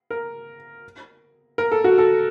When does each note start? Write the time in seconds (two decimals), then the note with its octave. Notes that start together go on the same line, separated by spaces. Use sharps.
0.11 A#4
1.58 A#4
1.72 A4
1.84 F#4
1.98 A4